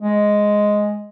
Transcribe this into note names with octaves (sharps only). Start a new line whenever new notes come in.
G#3